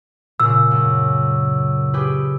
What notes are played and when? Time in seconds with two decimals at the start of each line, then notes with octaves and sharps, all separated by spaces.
0.40 A#2 C#3 E6
0.71 F#2
1.93 G4 G#4 B4